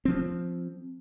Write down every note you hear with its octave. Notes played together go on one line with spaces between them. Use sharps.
F3 C4